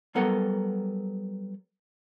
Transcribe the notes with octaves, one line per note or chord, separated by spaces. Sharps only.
F#3 G3 B3 A4 A#4 F#5